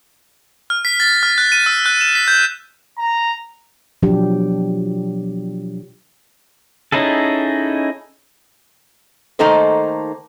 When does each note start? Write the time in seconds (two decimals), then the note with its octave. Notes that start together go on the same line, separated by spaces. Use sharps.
0.70 F6
0.85 B6
1.00 A6
1.23 F6
1.38 F#6
1.52 D#7
1.66 E6
1.86 F#6
2.01 E7
2.15 B6
2.28 G6
2.98 A#5
4.03 B2 F3 F#3 D4 G4
6.92 C#4 D#4 E4 G#4 A4
9.39 D#3 A3 A#3 D#4 A4 C5